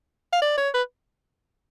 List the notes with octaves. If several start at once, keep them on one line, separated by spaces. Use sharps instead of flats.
F5
D5
C#5
B4